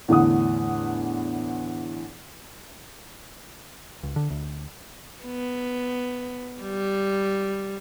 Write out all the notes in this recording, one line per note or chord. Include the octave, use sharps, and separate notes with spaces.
E2 A2 D3 F#5 D#6
C#2
D3
D2
B3
G3